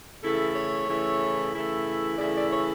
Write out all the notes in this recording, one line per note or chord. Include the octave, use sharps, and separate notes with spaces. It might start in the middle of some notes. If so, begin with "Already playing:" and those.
C#3 E3 A3 E4 A4
C#5
C#3 E3 A3 E4
C#3 E3 A3 E4
C#3 E3 A3 E4 D5
D5
C#5